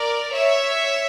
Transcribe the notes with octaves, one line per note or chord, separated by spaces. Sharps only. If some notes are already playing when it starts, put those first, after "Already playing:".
Already playing: A#4 D5
C#5 E5